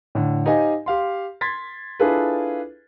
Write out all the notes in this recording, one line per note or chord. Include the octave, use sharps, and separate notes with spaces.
A2 D3
D#4 G4 C5 D#5 F5 G#5
G4 F5 C6
C6 G#6 A6 B6
D4 E4 F4 G#4 A4 B4